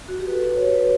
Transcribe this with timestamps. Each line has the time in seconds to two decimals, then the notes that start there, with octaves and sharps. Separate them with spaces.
0.09 F#4
0.20 G4
0.27 B4
0.32 A4
0.44 B4
0.56 C#5
0.72 B4